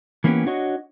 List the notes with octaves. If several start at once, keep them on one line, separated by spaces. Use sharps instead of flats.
E3 A#3 B3 C#4 E4 G4
D4 F#4 C#5 D#5